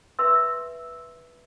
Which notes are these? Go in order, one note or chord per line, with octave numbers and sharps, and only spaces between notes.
B4 E5 C6 E6